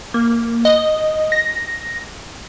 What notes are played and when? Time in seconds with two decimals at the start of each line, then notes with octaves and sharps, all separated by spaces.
0.14 A#3
0.65 D#5
1.32 A#6